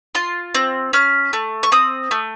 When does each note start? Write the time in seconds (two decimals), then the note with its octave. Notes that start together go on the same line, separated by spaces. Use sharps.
0.15 F4 C6
0.55 C4
0.93 C#4 F6
1.33 A3
1.63 C#6
1.72 C4 D#6
2.11 A3